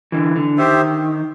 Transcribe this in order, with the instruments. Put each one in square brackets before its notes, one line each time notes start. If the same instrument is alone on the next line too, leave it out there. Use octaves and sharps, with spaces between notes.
[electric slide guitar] D3 E3
D3
[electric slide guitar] D#3 [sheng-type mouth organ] G4 C5 E5